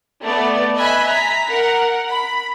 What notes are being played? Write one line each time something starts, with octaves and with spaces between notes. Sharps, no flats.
A3 B3 D5
D#5 E5 G#5 B5 F#6 B6
A#5 B6
A#4 F#5
B5